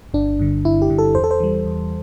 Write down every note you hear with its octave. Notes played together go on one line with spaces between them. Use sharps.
G1 D4
G2 D3
G1 E4
G4
G2 D3
A4
E2 C5
A4
C5
E3 G3
E2